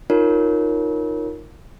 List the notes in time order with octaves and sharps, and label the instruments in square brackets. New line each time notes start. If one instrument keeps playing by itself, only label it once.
[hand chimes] D#4 F4 A#4 C#5